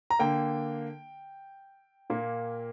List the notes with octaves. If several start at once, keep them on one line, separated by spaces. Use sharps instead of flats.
A#5
D3 A#3 G5
A#2 A#3